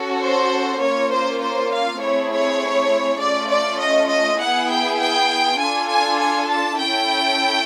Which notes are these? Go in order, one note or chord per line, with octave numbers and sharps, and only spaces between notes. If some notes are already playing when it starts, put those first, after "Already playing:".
Already playing: C#4 F#4 A4
C5
A#3 C#4 F4 C#5
C5
C5
F5
A3 C4 E4 G#4 C#5
C#5
A3 C#4 F4 D5
D5
D#5
D#5
B3 E4 G#4 F#5
G5
G5
D4 F4 A4 G#5
G#5
G#5
A5
C#4 E4 A4 G5